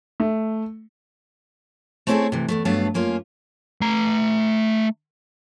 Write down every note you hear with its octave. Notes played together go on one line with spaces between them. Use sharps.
A3
A3 C4 C#4 E4 G#4 A4
C3 E3
E2 G#2 A3
G2 F#3 A3 B3 F5 A5
F#2 A#3 C#4 F4
A3 A#5